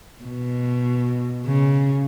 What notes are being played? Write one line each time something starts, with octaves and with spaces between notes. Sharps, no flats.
B2
C#3